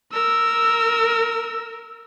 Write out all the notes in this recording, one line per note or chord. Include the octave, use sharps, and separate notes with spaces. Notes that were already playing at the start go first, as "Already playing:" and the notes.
A#4 E6